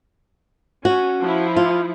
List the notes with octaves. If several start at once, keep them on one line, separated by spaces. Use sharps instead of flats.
C#4 F#4
F3 E4
F4